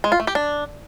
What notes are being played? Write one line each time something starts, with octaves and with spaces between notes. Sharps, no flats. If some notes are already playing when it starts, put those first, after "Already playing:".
G#3
F4
A3
G4
D4